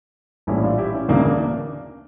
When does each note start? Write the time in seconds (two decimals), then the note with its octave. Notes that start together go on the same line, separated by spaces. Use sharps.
0.47 A#1 A2 E3 G3 C#4 E4
0.63 D4 F4
0.78 E4 G4
0.94 C#4 E4
1.08 D2 C#3 E3 A#3 D4
1.24 A#3 D4
1.39 A#3 D4